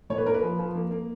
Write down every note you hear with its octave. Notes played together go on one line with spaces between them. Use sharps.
A#2 C#5
B4
A#3 A#4
B4
F3
F3
A#3
A#3